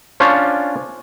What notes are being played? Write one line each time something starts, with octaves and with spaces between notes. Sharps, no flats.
C#4 D4 F4 C5 C#5